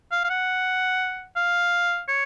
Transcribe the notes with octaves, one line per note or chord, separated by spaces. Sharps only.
F5
F5
F#5
F5
C#5